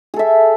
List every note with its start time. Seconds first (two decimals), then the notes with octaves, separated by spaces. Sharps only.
0.14 G#4
0.16 A4
0.19 E5